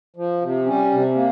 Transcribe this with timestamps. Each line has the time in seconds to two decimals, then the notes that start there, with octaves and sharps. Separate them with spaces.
0.16 F3
0.42 C3
0.66 G3 C#4
0.91 C3
1.15 A#3